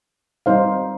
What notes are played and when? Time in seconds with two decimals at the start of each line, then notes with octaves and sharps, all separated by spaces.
0.46 G3 C4 D#4 C5 F5